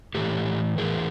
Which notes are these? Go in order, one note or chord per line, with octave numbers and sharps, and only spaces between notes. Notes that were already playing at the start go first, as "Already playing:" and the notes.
A2 E3 G4 A4
A2 E3 G#4 A#4